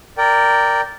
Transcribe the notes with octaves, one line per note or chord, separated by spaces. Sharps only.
A#4 D5 G5